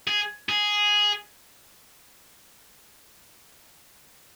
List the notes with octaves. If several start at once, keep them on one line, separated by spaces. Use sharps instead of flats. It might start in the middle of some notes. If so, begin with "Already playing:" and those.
G#4
G#4